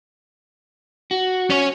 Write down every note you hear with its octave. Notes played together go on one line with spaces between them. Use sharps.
F#4
C#4 C#5